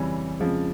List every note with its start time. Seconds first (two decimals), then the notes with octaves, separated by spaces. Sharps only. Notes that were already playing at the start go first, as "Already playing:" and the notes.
Already playing: F2 C#3 E3 G3 C#4
0.40 F2 C#3 F3 G#3